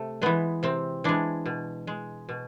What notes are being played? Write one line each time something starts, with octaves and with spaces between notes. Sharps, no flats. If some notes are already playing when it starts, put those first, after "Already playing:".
Already playing: C3 A3
E3 G#3 B3
C3 C4
E3 G#3 D4
B2
G#3
B2